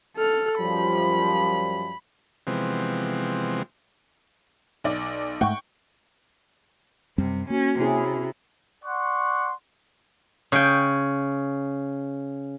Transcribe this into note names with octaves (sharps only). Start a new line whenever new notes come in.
A4 F6
F#2 F3 G3 B5
C3 E3 F3 G#3 B3 C4
B1 D5
G#2 A3 F#5 G5 C#6
F#2 C3 G3 C4
A#3 C#4 F#4
C3 C#4 E4 G#4
D5 F#5 C6 C#6
C#3 G5